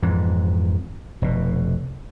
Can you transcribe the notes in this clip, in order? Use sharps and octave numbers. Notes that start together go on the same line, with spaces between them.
F2 G#2 E3
F1 B2